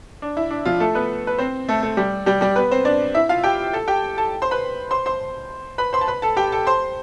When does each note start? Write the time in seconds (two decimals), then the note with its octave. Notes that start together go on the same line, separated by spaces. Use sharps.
0.22 D4
0.37 E4
0.51 D4
0.65 F3 F4
0.80 A3 A4
0.95 B3 B4
1.27 B4
1.38 C4 C5
1.69 A3 A4
1.83 A3 A4
1.97 G3 G4
2.26 G3 G4
2.41 G3 G4
2.56 B3 B4
2.71 C4 C5
2.85 D4 D5
3.15 E4 E5
3.29 F4 F5
3.44 G4 G5
3.73 A4 A5
3.88 G4 G5
4.17 A4 A5
4.42 C5 C6
4.51 B4 B5
4.91 C5 C6
5.06 C5 C6
5.78 B4 B5
5.93 C5 C6
6.01 A5
6.08 B4 B5
6.22 A4 A5
6.37 G4 G5
6.52 A4 A5
6.67 C5 C6